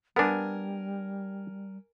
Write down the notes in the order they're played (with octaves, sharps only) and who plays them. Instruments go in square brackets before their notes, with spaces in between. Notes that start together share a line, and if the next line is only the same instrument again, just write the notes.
[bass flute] G3 [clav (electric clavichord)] B3 D4 [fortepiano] A#4 G#5